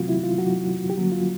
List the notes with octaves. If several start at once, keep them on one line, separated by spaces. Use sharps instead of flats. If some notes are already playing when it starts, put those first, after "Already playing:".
Already playing: C3 E3 F#3 A3 C4 F4 F#4
E4
F4
F#3 F#4
G4
D3 F#3 G3 A#3 C#4 F#4
F4